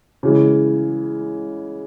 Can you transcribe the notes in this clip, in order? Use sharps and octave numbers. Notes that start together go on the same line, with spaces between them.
C#3 E3 G#3